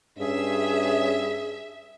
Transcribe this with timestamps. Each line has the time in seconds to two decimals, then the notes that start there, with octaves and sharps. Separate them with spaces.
0.19 G2 C#4 G#4 E5